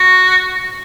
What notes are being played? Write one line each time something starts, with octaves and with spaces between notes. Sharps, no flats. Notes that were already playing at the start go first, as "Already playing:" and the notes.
Already playing: F#4